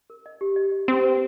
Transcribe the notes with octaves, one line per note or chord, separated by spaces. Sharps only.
A#4
D#5
G4
D#5
D#5
C4 G4
B4